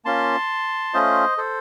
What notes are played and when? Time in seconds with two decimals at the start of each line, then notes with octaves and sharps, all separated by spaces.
0.05 A#3 C#4 F4 A5 C6
0.94 A3 C#4 F4 C5 D#5
1.38 A4 C5